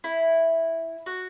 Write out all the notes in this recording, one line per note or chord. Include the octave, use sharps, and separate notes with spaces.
E4
F#4